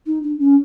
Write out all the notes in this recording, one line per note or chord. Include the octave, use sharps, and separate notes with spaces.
D#4
D4
C#4